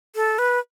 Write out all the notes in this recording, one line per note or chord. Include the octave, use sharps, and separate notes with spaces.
A4
B4